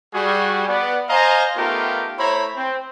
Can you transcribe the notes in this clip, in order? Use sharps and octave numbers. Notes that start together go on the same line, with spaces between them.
G3 F#4 G#4
B3 D5
C5 D#5 F5 G#5 A#5
A3 B3 D#4 F4 G4 A#4
A3 E4 C5 C#5 A#5 B5
C4